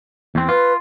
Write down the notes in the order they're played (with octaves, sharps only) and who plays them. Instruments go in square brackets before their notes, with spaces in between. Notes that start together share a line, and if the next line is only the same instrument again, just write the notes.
[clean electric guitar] E2 C4
[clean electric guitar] F4 [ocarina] B4